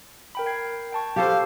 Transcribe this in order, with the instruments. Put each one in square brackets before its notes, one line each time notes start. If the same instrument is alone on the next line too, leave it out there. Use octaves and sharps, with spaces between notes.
[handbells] A#4 G5 B5
G5 G#6 C7
G5 A5 C#6
[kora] G4 A4 C5 [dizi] F5